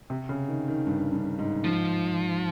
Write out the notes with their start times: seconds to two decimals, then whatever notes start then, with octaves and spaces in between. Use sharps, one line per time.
0.10 C3
0.29 C#3
0.49 D#3
0.68 D#3
0.87 G2
1.13 G2
1.39 G#2
1.64 G#2 F3